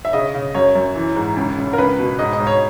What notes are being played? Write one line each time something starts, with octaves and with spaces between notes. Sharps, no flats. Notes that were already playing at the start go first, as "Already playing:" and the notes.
E5
C#3 D#5
C#3
F#2 C#5
F#2
E3
G#2
C#2
C#2
A#4
C#2 B4
B2
G#2 D#5
D#5
G#2
C#5